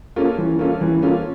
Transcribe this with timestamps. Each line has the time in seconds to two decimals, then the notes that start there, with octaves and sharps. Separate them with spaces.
0.16 A#3 C#4 F4 A4
0.38 E3
0.59 A#3 C#4 F4 A4
0.81 E3
1.02 A#3 C#4 F4 A4